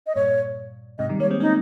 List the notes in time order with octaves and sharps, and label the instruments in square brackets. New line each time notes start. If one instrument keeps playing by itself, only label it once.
[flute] D#5
[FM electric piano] G2 A#2 [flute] C#5
[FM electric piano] G#2 C3 [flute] D#5
[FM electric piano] D#3 G3
[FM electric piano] G3 A#3 [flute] C#5
[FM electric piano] G#3 C4
[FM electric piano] A#3 C#4 [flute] D#4